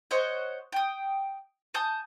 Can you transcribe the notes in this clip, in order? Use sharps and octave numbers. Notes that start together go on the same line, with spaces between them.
C5 C#5 D#5 F#5
G5 D#6
G#5 A5 D#6 G6